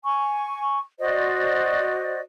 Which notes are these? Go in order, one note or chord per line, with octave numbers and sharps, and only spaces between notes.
G#5 C#6
F#4 C5 D5 D#5